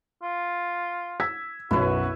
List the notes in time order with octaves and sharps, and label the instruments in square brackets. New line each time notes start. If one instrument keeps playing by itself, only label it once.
[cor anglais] F4
[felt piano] E6 G#6 B6
[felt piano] B1 F#2 B2 [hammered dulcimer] E4 B4 [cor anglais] F#4